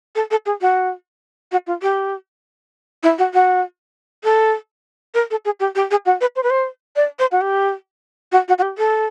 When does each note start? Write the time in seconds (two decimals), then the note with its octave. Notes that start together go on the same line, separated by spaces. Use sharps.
0.15 A4
0.31 A4
0.46 G#4
0.61 F#4
1.52 F#4
1.67 F4
1.82 G4
3.03 E4
3.18 F#4
3.34 F#4
4.24 A4
5.14 A#4
5.31 A4
5.45 G#4
5.60 G4
5.75 G4
5.91 G#4
6.05 F#4
6.21 B4
6.36 C5
6.43 B4
6.50 C5
6.96 D5
7.19 C5
7.32 F#4
7.41 G4
8.32 F#4
8.48 F#4
8.58 F#4
8.62 G4
8.78 A4